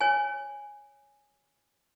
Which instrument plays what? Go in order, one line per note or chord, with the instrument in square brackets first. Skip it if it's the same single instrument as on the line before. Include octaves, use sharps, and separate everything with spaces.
[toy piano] C#5 G#5